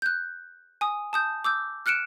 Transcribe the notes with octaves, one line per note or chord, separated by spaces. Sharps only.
F#6 G6
G#5 D#6
A5 D#6 G6
D6 E6 G6
F6 F#6 C#7 D7 E7